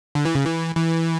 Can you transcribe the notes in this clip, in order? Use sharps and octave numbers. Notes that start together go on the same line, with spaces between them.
D3
E3
C#3
E3
E3